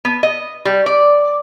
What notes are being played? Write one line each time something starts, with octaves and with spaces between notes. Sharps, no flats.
B3
D#5
G3
D5